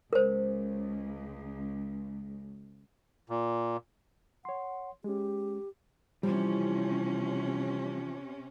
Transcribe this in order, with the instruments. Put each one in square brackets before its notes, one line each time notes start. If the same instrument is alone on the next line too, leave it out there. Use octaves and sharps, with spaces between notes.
[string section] C#2 [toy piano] A#4 C5
[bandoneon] A#2
[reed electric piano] C#5 C6 [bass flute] F#5
[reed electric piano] G#3 C#4 [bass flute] G4
[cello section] C3 C#4 [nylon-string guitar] E3 F3 [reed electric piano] G3